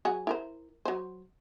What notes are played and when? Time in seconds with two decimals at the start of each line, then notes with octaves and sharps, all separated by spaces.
0.05 F#3 G#4 F#5
0.27 E4 A#4 C5
0.85 F#3 C5